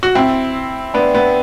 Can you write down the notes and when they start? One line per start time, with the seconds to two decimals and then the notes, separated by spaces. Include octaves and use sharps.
0.03 F#4
0.15 C4 E4
0.94 B3 D4
1.15 B3